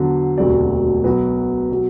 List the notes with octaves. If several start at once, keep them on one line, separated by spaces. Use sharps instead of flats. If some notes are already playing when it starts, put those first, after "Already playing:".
Already playing: E2 D3 F#3
E1 D2 C3 F#3 D5
B1 B2 F#3 B4
B2 F#3